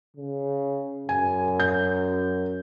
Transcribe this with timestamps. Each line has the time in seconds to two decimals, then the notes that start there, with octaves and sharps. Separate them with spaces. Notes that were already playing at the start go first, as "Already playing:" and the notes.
0.17 C#3
1.09 F#2 G#5
1.60 G6